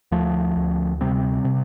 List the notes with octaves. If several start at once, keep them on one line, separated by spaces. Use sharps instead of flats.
D2 F3 A3
D2
C3 G3 C4
C3